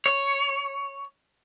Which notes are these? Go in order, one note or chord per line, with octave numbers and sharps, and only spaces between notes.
C#5